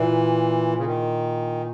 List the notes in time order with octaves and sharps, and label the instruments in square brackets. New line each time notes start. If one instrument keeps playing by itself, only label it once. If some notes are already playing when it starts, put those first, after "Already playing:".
Already playing: [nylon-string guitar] A#2 E4 [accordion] E3
[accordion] C#3
D#3